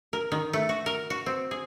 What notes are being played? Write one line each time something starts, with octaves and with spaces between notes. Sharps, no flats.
A#4
D#3
A3
F#4
A#4
F#4
C4
G#4